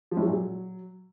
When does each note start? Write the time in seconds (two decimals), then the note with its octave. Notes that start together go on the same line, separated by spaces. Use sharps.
0.11 F3
0.17 A2
0.22 F#3
0.28 A#2
0.33 F#3